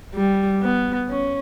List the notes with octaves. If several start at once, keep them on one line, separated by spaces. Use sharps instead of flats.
G3
B3
C#4